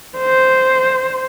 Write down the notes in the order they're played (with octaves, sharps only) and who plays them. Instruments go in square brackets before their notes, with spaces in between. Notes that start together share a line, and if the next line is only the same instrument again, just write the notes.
[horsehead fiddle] C5